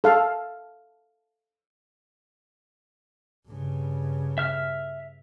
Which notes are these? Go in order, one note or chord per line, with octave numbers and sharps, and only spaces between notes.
A4 F5
G2 C#3
E5 F6